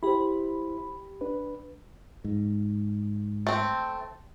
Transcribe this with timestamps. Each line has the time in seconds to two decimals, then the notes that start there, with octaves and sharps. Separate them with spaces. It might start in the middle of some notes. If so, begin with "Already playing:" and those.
0.03 E4 G4 C5 B5
1.21 D4 B4
2.24 G#2
3.47 A3 C4